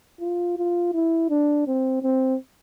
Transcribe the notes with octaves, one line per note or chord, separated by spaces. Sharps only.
F4
F4
E4
D4
C4
C4